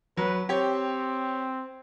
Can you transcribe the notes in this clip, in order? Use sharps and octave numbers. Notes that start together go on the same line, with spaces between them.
F#3 B4
C4 G4 C#5